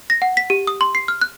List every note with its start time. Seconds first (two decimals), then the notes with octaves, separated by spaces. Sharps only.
0.10 A#6
0.22 F#5
0.37 B6
0.50 G4
0.67 D#6
0.81 C6
0.95 C7
1.08 F6
1.21 F#6